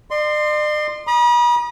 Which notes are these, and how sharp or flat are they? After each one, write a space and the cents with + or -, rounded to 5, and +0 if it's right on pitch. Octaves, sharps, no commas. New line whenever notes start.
D5 +45 C6 +0
B5 -45 D#6 -25